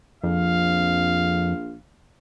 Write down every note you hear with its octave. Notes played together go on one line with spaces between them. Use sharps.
A#1 F2 F5